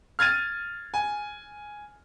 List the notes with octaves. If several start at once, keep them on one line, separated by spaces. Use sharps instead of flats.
F6 G#6 A6 D#7
G#5